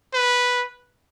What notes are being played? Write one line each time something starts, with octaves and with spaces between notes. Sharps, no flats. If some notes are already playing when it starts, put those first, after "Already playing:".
B4